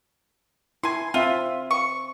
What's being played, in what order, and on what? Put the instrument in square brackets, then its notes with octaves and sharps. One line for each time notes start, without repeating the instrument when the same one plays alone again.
[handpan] E4 [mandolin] G#5 C6
[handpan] C4 E5 [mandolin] F4
[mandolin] C#6